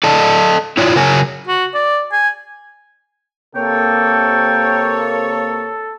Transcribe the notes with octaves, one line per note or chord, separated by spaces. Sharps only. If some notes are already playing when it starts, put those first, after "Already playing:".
A4 D5 D#5 A5
E4 F4 C#5 D5
C#3 F#3 A#4 C#5 G#5
F#4
D5
G#5
C3 A#3 A4 C#5 G5